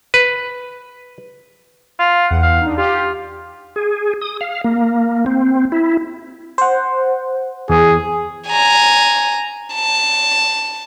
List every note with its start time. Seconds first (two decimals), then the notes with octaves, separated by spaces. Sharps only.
0.14 B4
1.99 F4
2.26 E2 F#5
2.43 F5
2.61 D4 D#4
2.77 F4 G4
3.76 G#4
4.21 D#6
4.41 F5
4.64 A#3
5.26 C4
5.72 E4
6.58 C5 F#5
7.70 E2 G#4
8.49 G#5 A#5
9.74 A5